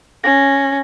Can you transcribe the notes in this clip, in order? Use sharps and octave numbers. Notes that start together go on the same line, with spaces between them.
C#4 A#6